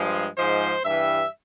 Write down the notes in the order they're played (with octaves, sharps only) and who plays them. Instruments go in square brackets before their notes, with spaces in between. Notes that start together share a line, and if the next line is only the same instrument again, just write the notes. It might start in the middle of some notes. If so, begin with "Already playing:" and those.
Already playing: [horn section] G2 F3 G#3
G#2 F3 G#3 C5
G2 E3 G3 E5